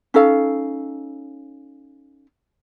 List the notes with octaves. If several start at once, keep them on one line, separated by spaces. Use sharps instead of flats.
C#4 D#4 A4 F5